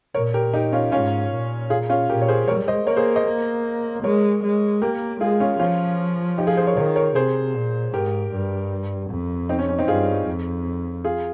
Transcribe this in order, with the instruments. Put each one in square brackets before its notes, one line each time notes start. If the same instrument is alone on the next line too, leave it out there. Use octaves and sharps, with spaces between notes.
[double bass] A#2 [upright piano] A#4 C#5
[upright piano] G4 A#4
D#4 G4
C#4 F4
[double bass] G#2 [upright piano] C#4 F4
[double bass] A#2
[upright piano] F4 G#4
C#4 F4
[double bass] A#2 [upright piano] G4 A#4
[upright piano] C#5
G#4 C5
[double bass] G#3 [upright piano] A#4 C#5
[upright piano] C5 D#5
[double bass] A#3 [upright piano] A#4 C#5
[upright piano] G#4 C5
C5 D#5
[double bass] A#3
[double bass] G#3 [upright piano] A#4 C#5
[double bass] G#3
[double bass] A#3 [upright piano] G4 A#4
[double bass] G#3 [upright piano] F4 G#4
[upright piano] C#4 F4
[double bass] F3 [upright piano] C#4 F4
[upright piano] D#4 G4
F4 G#4
G#4 C5
A#4 C#5
[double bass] D#3 [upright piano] A#4 C#5
[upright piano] A#4 C#5
[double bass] C3 [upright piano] G#4 C5
[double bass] A#2
[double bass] G#2 [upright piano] G4 A#4
[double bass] G2
F2
[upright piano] C4 D#4
C#4
C#4
C4 D#4
[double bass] G2 [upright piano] F4 G#4
[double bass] F2
[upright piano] F4 G#4